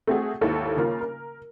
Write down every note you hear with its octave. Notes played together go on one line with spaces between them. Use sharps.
A3 C4 F#4 G#4
G#1 D#2 E4 A4
C#3 A#3 F4
A#4